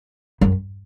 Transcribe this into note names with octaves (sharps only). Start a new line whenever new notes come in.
F#2